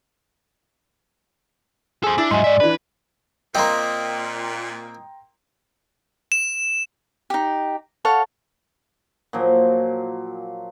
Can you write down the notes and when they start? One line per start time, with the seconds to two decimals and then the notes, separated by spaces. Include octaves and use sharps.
2.03 G#4 A4 C5 G#5
2.18 D4 E4 A6
2.31 G#2 F#3 D#5 E5 G#5 C6
2.44 G#2 D5 E5
2.60 E3 D4 B4
3.55 A#2 A#3 C4 D#5 G5 A#5 C6
6.32 E7
7.30 D#4 G4
8.05 A4 C#5 F5 F#5
9.33 A#2 F3 F#3